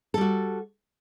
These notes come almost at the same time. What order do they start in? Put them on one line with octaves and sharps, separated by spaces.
A4 G3 F#4